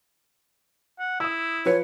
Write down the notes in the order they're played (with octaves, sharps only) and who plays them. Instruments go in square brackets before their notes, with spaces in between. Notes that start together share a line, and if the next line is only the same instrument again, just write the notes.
[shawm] F#5
[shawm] E4 [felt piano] D#6 E6
[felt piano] F3 B4 C#7 [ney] C#5